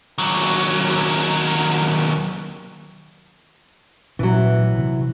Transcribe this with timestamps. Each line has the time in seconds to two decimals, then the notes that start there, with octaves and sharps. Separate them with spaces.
0.18 D#2 F#3
4.19 A1 A#2 E3 F#3 C#4
4.78 C3